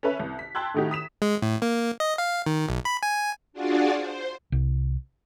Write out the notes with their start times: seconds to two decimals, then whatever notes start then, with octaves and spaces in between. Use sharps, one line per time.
0.03 C#4 A4 B4 E5
0.20 C2
0.39 B6
0.55 G5 A5 C6 E6 F#6 G#6
0.74 A2 D#3 A3 D#4 F#4 G4
0.91 D#6 B6 E7
1.22 G#3
1.42 A2
1.62 A#3
2.00 D#5
2.18 F5
2.46 D#3
2.69 B1
2.85 B5
3.03 G#5
3.53 D4 F4 F#4 G#4 D5 F#5
3.96 C5
4.52 C2